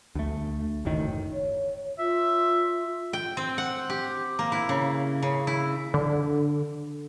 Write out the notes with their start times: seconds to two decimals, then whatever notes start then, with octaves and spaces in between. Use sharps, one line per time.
0.15 D2 A3
0.85 F#1 D2 A2 D#3
1.33 C#5
1.99 F4 E5
3.13 G5
3.37 C4
3.58 F#5
3.90 G4
4.39 A#3
4.52 E4
4.69 C#3
5.22 C#3
5.47 E4
5.94 D3